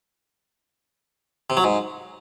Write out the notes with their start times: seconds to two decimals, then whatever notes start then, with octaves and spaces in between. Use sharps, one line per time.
1.50 C3
1.57 F#3
1.64 G#2